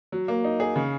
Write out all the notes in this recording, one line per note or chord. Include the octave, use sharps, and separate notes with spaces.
F#3
A#3
D#4
G#4
C#3